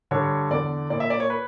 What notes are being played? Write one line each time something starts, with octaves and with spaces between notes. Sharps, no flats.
G2 D3 C#5
E2 D3 D5
A#2 D5
E5
D5
C#5
B4